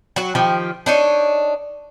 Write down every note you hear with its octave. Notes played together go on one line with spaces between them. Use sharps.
F#3 F#4
D#3 F3 G4
D4 D#4 C#5